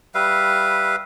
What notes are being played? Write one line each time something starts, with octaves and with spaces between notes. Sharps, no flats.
G3 B4 E5 F5